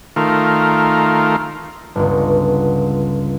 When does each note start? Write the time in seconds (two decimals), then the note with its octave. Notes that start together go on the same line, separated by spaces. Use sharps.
0.16 D#3 A3 F4 A#4
1.96 G1 C#2